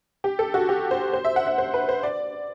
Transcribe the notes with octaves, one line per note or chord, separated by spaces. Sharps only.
G4
A4
F#4
G4
C5
C5
E5
F#5
E5
C5
B4
C5
D5